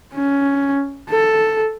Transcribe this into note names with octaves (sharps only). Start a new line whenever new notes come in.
C#4
A4